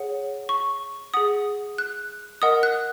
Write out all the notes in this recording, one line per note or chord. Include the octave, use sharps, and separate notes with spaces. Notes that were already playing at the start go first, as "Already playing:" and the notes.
Already playing: G#4 C#5 F#5
C#6
G#4 F#5 D#6
F#6
A#4 D#5 F#5 D#6
F#6